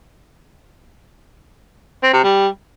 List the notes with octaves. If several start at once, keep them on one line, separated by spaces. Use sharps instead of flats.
C4
C3
G3